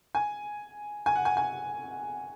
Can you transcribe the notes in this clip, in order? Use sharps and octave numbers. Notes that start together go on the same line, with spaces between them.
G#5
G#5
F#5
G#5
G#5